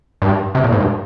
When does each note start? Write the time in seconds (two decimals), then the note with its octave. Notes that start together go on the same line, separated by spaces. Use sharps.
0.22 G2
0.55 C3
0.64 A#2
0.72 G#2
0.80 G2